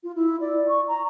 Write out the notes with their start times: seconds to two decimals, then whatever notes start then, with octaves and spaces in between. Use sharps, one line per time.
0.04 F4
0.15 E4
0.41 D5
0.69 C#6
0.88 A#5